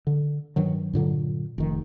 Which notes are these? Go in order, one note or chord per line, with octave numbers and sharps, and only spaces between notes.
D3
G2 D#3 F#3
G2 A#2 D3 F#3
F1 D#3